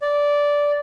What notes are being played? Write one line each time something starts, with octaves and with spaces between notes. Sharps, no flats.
D5